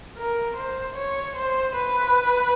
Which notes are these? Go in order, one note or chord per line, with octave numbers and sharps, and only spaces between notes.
A#4
C5
C#5
C5
B4